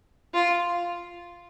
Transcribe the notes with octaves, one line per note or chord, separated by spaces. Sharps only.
F4